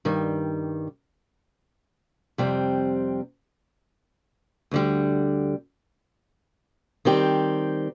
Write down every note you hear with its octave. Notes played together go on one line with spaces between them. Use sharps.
G2 D#3 G3
F2 C3 G3 C4
D2 D3 G3
D#3 G3 C4 G4